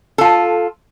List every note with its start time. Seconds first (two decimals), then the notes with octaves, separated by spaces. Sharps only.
0.18 F4 A4